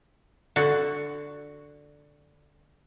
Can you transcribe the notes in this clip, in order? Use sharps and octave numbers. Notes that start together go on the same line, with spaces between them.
D3 F#4